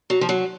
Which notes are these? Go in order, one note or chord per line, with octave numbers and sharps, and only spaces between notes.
F#3
F3
F#3